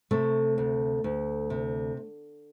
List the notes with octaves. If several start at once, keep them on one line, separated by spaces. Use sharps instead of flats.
C3 A3
D2
D2
C3